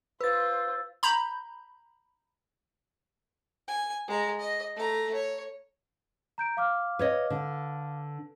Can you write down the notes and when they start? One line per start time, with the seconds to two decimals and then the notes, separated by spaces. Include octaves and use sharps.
0.21 F4 B4 C5 E6 A6
1.03 A#5 B5 G6
3.68 G#5
4.08 G#3 A#5
4.39 D#5
4.76 A3 A#5
5.14 C#5
6.38 A#5 G6 D7
6.57 F5 D6 F6
6.99 B4 C#5 D#5
7.30 D3